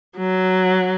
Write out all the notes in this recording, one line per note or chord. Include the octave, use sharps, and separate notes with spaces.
F#3